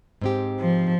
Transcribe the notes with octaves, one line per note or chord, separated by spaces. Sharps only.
G#2 C4 G4
F3